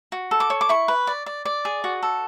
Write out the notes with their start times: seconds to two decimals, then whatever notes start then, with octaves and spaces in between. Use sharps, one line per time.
0.12 F#4
0.31 A4
0.40 D6
0.50 C#5
0.61 D6
0.69 E4 C#6
0.88 B4
1.07 D5
1.26 D5
1.45 D5
1.65 G#4
1.84 F#4
2.03 A4